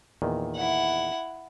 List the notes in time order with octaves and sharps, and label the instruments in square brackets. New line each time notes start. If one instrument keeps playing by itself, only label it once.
[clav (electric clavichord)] E2 A#2 D#3
[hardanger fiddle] E4 F#5